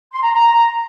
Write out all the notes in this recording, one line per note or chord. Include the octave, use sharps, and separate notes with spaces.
C6
A#5
A#5